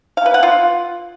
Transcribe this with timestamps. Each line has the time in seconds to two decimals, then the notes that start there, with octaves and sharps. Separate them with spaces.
0.17 F5
0.26 B4
0.34 F#5
0.43 F4